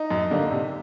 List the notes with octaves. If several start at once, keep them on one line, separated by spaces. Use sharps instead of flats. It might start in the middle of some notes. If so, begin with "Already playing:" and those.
Already playing: D#4
F#2
D3 G3 A#3
C3